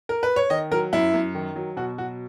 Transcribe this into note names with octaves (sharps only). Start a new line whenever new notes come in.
A#4
B4
C#5
D#3 D#5
F#3 A#4
F#2 E4
F#2
D#3
F#3
B2 F#4
F#3 F#4